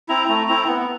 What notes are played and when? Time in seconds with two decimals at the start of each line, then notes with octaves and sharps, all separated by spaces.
0.09 C4 E4 A#5
0.28 A3 A#5
0.48 C4 E4 A#5
0.67 B3